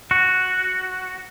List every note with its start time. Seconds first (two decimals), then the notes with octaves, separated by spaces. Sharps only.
0.11 F#4